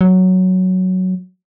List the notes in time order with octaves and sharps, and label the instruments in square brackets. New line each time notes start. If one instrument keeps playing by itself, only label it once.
[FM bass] F#3